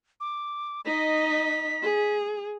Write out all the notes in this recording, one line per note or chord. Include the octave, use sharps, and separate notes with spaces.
D6
D#4 D#5 B6
G#4